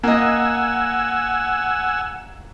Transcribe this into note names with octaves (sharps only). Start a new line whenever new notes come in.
A#3 D#5 F#5 G#5 E6